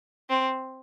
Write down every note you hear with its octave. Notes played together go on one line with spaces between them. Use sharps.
C4